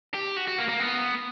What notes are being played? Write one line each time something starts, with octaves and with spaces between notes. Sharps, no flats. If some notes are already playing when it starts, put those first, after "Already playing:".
G4
F#4
F#4
A#3
A#3
B3